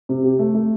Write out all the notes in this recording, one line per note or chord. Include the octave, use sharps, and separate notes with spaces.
C3
G4
A3
A3